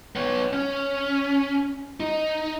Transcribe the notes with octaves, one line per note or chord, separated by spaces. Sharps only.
B3 C#5
C#4
D#4